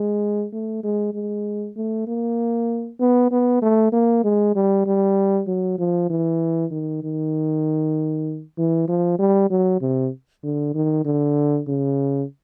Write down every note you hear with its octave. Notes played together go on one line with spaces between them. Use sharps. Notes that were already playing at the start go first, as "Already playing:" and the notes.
Already playing: G#3
A3
G#3
G#3
A3
A#3
B3
B3
A3
A#3
G#3
G3
G3
F#3
F3
E3
D#3
D#3
E3
F3
G3
F#3
C3
D3
D#3
D3
C#3